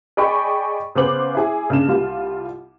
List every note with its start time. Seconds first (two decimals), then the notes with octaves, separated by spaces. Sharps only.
0.17 G#4 D5 D#5 G5 B5 C#6
0.95 C#3 B3 C#4 C5 D6 F#7
1.35 E4 G#4
1.70 C#3 D4 E7
1.87 C2 G3 F4